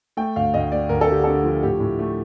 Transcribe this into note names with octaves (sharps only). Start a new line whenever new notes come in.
A3 G5
D2 F5
D2 D#5
A3 D5
D2 A#4
A4
D3 G4
D3 A4
F3
A2 G4
A2
A3